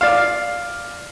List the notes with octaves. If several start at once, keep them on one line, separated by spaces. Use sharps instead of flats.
D5 F5